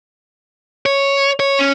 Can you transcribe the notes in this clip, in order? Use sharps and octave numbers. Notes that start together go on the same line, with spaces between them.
C#5
C#5
C#4